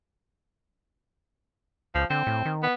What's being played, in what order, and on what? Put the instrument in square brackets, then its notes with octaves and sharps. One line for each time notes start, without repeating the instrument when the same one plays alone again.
[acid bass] C#2 [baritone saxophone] F3
[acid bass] D3 [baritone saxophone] C4
[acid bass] A2
D#3
[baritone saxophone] B3